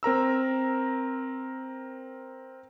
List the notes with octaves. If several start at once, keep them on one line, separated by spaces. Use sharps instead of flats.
C4 A#4 A#5 E6